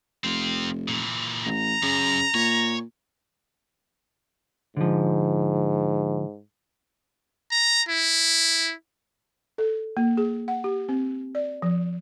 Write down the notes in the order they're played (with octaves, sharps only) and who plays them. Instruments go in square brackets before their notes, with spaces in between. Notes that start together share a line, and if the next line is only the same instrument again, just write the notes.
[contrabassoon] F1 [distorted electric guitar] C4 F4
[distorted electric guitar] A#2 E3
[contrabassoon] A1 [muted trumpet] A#5
[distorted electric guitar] F#2 [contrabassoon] C#3
[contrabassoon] A#2 [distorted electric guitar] C#5
[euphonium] G#2 [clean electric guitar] D3 F3
[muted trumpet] A#5
E4
[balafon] A4
A#3
G#4
F#5
G4
C4
D5
F3